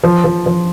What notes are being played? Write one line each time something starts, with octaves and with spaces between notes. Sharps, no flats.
F3
F3
F3